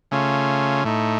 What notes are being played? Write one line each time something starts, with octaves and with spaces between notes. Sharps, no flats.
C#3 A3 C#4 F4
A2 A3 D#4